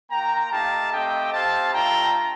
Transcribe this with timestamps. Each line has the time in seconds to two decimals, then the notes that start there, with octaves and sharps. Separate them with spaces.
0.11 A#3 F4 G5 A#5
0.52 A3 D#4 G4 F5 A5
0.92 A3 C4 G4 D#5 G5
1.33 C4 G4 F5 A5
1.73 A3 D4 F4 G5 A#5